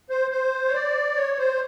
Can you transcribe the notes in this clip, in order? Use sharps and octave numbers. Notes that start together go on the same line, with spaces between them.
C5
C5
C#5
D5
C#5
C5